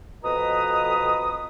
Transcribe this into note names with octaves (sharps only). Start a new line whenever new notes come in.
F2 B2 B4 D#5 A#5 D#6